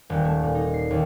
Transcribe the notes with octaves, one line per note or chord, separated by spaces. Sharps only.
D#1
A3
A#2
D#4
C7
D#2